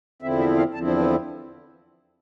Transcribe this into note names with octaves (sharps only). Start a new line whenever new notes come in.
E2 D3 F3 C4 E4 E5
E5
F5
E2 D3 F3 C4 E4 A5
C5
B4